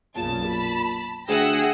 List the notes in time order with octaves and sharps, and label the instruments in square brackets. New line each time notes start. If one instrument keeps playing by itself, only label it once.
[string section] B1 F#2 C#3 [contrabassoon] A#2 [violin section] A5
[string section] B5
[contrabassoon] D2 [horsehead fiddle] G#4 [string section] E5 G5 A#6 [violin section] F#5 E6